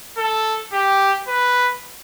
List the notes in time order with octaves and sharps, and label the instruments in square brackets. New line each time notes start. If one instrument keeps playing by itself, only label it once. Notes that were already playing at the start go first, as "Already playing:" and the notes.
[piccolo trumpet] A4
G4
B4